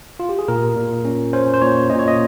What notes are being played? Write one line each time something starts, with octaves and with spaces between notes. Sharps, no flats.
F4
G4
G#4
A#2 A#4
A#2
C#4
C#4 C5
C5
A#2 C#5
A#2 D#5
C#5
D#5